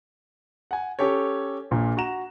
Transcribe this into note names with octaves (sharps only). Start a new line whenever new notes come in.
F#5 G#5
C#4 G4 A4 C#5
A#1 A#2 A#3
F#4 F#5 A#5 E7